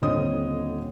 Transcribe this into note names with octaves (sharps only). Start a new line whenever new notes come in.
D#1 D3 C4 C#5 D#5 D#6